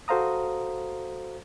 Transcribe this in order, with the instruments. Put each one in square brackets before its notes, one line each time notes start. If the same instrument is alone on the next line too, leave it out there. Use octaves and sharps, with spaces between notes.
[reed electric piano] F#4 A4 C5 F5 A#5 D#6